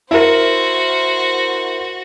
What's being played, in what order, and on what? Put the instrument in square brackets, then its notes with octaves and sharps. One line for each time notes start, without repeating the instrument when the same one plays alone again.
[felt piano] E4 A#4 [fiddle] F#4 [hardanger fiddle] C5